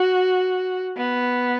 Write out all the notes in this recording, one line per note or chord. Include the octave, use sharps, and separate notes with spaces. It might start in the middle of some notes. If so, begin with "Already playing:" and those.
Already playing: F#4
B3